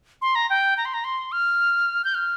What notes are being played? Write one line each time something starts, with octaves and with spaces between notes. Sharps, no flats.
C6
A#5
G5
A#5
C6
A#5
C6
F6
G6
F6